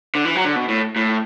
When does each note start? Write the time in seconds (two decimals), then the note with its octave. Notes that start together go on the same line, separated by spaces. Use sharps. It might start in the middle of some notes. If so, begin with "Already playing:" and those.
0.15 D3
0.25 E3
0.35 F#3
0.45 D3
0.56 B2
0.68 A2
0.96 A2